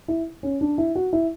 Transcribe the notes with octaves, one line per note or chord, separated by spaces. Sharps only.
E4
C#4
D4
E4
F#4
E4